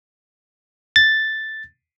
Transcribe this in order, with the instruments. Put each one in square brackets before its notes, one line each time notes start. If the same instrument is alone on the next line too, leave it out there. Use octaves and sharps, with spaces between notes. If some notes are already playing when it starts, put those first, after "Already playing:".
[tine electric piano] A6